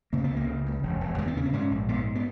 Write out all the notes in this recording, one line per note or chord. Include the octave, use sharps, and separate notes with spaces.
C#3 A#3
B3
C#2
A#3
C#3
C#2
E1
E1
D#2 G#3
B3
C#3 C#4
B3
G#2 C#4
A#1
G#2 B3
B3